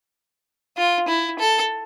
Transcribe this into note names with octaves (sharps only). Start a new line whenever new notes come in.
F4
E4
A4